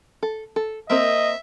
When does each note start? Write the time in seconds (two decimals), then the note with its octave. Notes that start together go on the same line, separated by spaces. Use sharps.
0.23 A4
0.56 A4
0.90 A#3 C4 A#4 D#5 E5